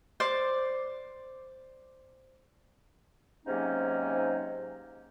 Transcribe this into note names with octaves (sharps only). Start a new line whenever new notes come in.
C5 D5 D6
G#2 C3 F#3 A#3 C#4 D#4